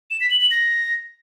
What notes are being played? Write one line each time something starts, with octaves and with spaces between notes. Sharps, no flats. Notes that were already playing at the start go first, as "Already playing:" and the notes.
E7
B6
F#7
F#7
A#6